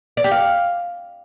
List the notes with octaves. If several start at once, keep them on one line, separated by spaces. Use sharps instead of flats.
D5
G4
F5